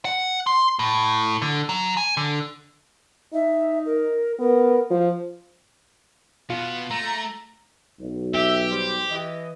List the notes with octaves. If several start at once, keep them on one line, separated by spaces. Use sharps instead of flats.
F#5
C6
A2
D3
F#3
G#5
D3
D#4 E5
A#4
B3 A#4
F3 C5
B2 B3 F4
A3 A#5
B1
G4 E5
G3 C5
E3 D#5